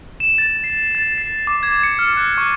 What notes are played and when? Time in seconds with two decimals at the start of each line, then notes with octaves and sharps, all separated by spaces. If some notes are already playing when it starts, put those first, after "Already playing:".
0.20 E7
0.38 A6
0.64 C7
0.95 A6
1.18 C7
1.47 D6
1.63 G#6
1.83 C#7
1.99 F6
2.17 F#6
2.38 C#6